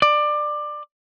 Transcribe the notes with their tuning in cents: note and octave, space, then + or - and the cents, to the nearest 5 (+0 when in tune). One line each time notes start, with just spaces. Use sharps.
D5 +20